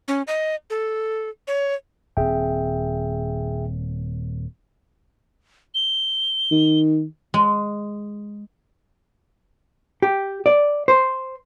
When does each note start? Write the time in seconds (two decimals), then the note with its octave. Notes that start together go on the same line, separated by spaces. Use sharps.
0.08 C#4
0.27 D#5
0.70 A4
1.48 C#5
2.17 D#1 C4 G#4 E5 G5
5.75 G7
6.51 D#3
7.34 G#3
10.02 G4
10.46 D5
10.88 C5